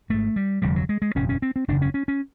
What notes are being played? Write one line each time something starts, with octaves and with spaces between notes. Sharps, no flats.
G#1 G#2 A3
G3
F1 F2 D3 G3
F#3
G#3
G#3
F#1 E2 B2 C#4
C#4
C4
C4
F#1 E2 C#3 D4
C#4
C#4
C#4